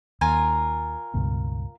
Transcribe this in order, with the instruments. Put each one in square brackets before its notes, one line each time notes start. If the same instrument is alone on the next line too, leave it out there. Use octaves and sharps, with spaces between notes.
[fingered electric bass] D#2 [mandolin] F4 A#4 G#5
[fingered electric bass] C#2 G2 B2